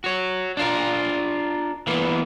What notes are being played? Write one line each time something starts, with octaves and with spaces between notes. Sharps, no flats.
F#4 C#5
D4 F4 A#4
E3 A#3 B3